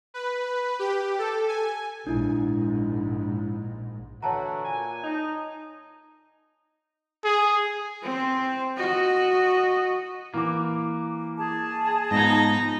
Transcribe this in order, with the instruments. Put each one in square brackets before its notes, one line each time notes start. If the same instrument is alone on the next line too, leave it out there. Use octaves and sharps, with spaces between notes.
[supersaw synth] B4
G4
A4
G#5
[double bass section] A#1 G#2 [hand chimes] D4 E4
[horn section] D3 E3 F#4 [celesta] C#5 A5 A#5
[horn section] A#2 G#5
D#4
[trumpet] G#4
[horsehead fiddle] C4 C5
F#4 D#5
[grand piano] E3 D6 [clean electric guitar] A#3
[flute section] G#4 A5
[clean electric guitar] G#2 F3 [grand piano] B3 [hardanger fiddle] D#4 D#5